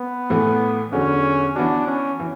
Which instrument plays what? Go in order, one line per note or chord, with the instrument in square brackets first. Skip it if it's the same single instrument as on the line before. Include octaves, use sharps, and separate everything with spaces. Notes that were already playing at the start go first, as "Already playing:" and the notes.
Already playing: [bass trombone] B3
[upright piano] A2 E3 A3
[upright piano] E2 D3 F#3 [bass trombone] C#4
[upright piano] E3 B3 F#4 [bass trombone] D4
[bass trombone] C#4
[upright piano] E3